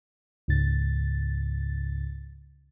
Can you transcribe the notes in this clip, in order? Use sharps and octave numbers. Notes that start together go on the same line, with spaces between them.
C#2 G#2 C#3 A6